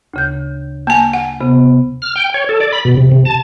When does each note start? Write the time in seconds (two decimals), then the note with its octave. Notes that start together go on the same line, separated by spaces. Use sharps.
0.14 D2 C#3 G6
0.87 A#3 G#5 A5
1.14 F#5
1.41 C3 B3
2.02 F6
2.16 G5
2.34 C#5
2.49 A4
2.61 D5
2.73 B5
2.85 B2
2.97 C3
3.12 C3
3.25 A5